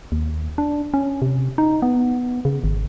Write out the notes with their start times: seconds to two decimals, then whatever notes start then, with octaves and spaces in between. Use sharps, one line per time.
0.12 D#2
0.58 D4
0.94 C#4
1.22 C3
1.58 D#4
1.82 B3
2.45 C#3
2.64 G#1